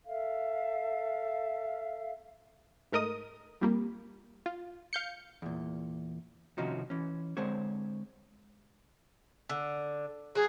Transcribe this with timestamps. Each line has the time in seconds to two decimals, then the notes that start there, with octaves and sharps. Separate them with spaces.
0.06 A4 E5 F5
2.92 G#2 A3 A#4 D#5 D#6
3.61 F2 G3 A#3
4.46 F4
4.93 F5 G6 C#7
5.42 E2 A#2
6.58 C3 D#3 F3 C#4 D#4 F#4
6.90 E3 C#4
7.37 D3 G#3 C4 C5 C#5
9.49 D3
10.35 F#3 G#4